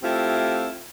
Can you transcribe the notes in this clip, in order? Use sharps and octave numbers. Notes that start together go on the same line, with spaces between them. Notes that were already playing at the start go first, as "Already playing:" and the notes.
A3 C4 E4 F4 G4